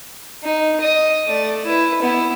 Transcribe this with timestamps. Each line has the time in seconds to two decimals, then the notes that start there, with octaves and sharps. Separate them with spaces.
0.44 D#4
0.80 D#5 D#6
1.27 A3 D5
1.65 E4 B4
2.02 B3 E4